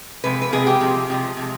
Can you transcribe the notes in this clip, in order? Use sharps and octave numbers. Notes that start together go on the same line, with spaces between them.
C3 F3 G#3 B4
B4
C3 F3 G#3 G#4
G4
C3 F3 G#3
C3 F3 G#3
C3 F3 G#3